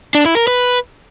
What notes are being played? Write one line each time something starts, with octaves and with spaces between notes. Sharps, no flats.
D4
E4
A#4
B4